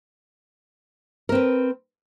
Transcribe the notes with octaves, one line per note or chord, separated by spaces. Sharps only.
C4 A#4 B4